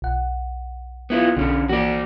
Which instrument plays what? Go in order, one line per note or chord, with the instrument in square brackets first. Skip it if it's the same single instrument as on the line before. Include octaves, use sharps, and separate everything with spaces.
[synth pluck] B1 F#5
[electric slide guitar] B3 E4 F4
[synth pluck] B1 [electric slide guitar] D3 C#4
[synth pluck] E3 A#3 [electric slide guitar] F#4 D5